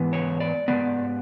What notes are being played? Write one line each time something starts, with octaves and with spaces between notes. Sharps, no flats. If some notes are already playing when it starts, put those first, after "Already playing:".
Already playing: G#2 E3 B3
C#5
D5
G#2 E3 B3 D5